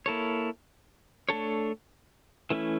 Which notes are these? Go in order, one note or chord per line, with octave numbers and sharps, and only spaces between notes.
A#3 E4 A4 C#5
A3 D4 A4 C#5
E3 A3 C#4 E4